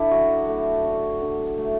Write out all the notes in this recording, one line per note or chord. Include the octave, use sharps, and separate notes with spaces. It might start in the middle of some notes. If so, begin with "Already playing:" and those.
Already playing: D3 D4 E4
F#3 F#4
A3
D3
D3
A3